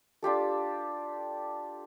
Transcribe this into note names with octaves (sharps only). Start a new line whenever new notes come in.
D4 F4 G4 A4